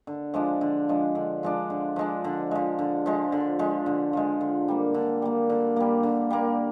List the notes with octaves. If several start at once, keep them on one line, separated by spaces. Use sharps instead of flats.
D3
F3 G#3 D4
D3
F3 G#3 D4
D3
F3 G#3 D4
D3
F3 G#3 D4
D3
F3 G#3
D3
F3 G#3
D3
F3 G#3
D3
F3 G#3
D3
G3 A#3
D3
G3 A#3
D3
G3 A#3
D3
G3 A#3